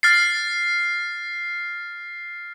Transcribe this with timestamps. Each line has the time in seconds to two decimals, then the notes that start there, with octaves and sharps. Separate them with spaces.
0.03 F6 A6 C7